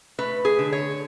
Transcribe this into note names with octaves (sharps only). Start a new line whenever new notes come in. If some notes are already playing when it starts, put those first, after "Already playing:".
A3 B4
G#4
D3
C#5